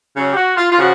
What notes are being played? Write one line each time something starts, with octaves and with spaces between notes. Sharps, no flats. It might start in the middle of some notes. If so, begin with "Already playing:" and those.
C#3 F#3 C#4
G4
F#4
F4
F4
C#3 F3 F#4